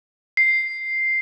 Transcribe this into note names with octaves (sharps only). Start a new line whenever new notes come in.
C7